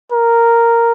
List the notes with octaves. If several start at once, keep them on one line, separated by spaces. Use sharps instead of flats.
A#4